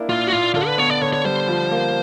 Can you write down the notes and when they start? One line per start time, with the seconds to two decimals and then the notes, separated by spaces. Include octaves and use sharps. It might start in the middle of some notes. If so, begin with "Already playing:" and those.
Already playing: A#3 D4 E4
0.09 A#2 F4
0.27 F#4
0.33 A#2 F4
0.55 D3 F4
0.67 B4
0.78 B3 C#5
0.90 D5
1.02 D3 C#5
1.13 C#5
1.25 G3 C5
1.48 F3
1.71 A#3